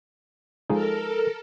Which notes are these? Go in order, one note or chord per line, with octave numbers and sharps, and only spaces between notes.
F3 G#3 D#4 A4 A#4